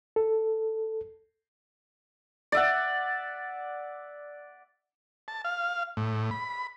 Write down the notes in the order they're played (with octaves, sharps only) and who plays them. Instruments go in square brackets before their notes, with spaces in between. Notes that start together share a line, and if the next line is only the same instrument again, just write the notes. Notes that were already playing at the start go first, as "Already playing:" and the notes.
[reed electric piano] A4
[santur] D5 E5 F#5
[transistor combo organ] A5
F5
A2
B5